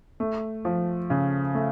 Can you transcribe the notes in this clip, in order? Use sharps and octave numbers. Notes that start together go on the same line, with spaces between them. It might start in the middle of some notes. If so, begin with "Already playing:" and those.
A3
F3
C#3
A3